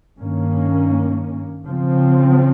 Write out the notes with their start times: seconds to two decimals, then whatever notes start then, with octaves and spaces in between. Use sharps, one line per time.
0.19 G2 D#3 A#3 C#4
1.68 C#3 F3 C4